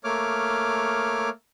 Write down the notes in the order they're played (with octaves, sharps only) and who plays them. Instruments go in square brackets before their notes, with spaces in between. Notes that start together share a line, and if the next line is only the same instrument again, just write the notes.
[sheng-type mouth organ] A3 A#3 C#5 D6 F6